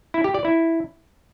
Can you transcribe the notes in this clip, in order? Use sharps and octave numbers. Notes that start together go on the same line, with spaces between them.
E4
G4
D5
E4